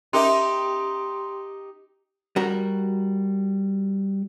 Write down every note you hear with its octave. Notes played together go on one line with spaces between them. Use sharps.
C#4 D#4 G4 A#4 E5 C6
G3 F#4 A#4